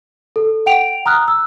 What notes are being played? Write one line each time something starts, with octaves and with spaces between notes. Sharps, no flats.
A4
F#5 G5 D7 F7
A#5 D#6 F6 F#6
E6